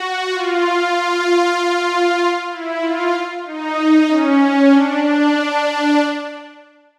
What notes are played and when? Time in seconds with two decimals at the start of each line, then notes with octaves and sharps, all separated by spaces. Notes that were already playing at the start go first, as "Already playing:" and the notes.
Already playing: F#4
0.30 F4
2.50 E4
2.82 F4
3.45 D#4
4.08 C#4
4.70 D4
5.02 D4